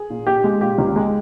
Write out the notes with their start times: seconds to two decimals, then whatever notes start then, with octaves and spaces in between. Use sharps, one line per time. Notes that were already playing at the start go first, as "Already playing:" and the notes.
Already playing: G#4
0.10 A#2
0.27 A#2 G4
0.44 G#3
0.61 A#2 G4
0.78 C#2
0.96 G#3